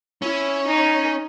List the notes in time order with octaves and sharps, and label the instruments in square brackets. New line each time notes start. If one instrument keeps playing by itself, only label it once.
[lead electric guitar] C#4 [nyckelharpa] E4
[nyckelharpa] D#4